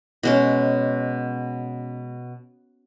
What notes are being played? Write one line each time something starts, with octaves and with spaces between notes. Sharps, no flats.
B2 G#3 C#4